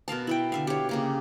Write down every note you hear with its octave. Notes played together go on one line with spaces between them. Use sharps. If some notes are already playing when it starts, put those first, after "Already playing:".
B2 A#4 F5 A5
E4 E5 G5
D3 E5 F5
G4 C#5
C#3 A#3 G4